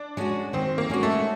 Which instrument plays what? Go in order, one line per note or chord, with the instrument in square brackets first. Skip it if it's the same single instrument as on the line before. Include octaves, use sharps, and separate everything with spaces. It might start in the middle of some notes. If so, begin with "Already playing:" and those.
Already playing: [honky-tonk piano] D4
[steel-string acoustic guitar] G#3 C#4 F#4
[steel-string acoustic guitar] D#3 [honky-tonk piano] C4
[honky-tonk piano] A#3
[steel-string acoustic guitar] G#3 C#4 F#4
[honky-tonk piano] A3